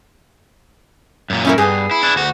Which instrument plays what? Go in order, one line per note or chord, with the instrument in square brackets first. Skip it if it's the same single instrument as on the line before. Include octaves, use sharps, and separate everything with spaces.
[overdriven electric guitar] F#2 A#2
[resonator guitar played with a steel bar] C#4 E4 A#4
[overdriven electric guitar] G2 [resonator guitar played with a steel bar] B3 G#4
[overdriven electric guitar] E4
D4 E4
D2 F#4